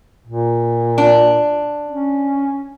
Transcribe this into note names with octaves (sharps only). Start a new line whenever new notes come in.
A#2
D4
C#4